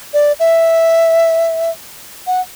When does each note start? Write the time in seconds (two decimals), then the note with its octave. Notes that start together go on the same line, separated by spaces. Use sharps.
0.14 D5
0.40 E5
2.27 F#5